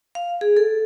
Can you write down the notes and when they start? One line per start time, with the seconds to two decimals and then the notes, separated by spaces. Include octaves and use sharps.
0.15 F5
0.41 G#4
0.57 A4